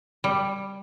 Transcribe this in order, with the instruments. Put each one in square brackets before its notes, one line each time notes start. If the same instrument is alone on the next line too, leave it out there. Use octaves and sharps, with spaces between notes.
[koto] G3